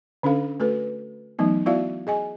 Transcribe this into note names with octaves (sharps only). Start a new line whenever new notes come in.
D3 C#4 D4 A4 F5
A3 F#4 A4 B4
E3 F#3 A3 B3 D#4
B3 E4 F#4 D5 E5 F5
G#4 D#5 G#5